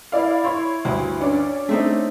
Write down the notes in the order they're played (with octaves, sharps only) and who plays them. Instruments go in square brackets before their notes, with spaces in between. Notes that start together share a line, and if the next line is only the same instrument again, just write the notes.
[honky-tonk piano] E4 D5 F5
E4 C#5 C6
[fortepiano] D2 G2
[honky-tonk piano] C#4 D4
[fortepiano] A3 C4 D#4